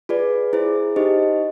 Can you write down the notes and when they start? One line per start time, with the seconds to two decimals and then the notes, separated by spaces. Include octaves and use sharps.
0.09 F4 G#4 B4 D5
0.53 E4 G#4 C5
0.96 D#4 G4 C5 D#5